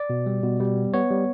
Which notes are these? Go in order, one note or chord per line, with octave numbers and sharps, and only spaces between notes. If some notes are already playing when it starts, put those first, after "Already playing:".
Already playing: D5
B2
G3
B2
G3
B3
B3 C#5
G3